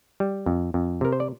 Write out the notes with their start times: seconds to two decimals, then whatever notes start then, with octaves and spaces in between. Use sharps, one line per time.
0.20 G3
0.46 F2
0.74 F2
1.01 C3 A#4
1.12 C5
1.20 D5